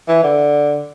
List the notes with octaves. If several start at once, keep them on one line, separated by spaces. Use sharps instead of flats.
E3
D3